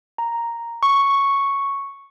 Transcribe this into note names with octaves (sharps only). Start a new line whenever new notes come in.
A#5
C#6